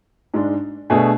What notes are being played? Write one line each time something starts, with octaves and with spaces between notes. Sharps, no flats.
G#2 G#3 D4
B2 A3 D4 G#4